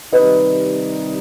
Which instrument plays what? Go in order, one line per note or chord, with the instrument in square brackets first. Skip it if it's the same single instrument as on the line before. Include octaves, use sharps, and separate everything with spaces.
[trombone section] C3 D#3 G3 D#4 [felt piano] B4 D#5